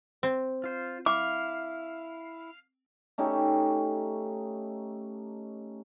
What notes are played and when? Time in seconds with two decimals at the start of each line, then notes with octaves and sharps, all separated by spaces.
0.23 C4
0.64 F4 C5
1.06 E4 F5 D6
3.18 A3 C#4 D#4 G4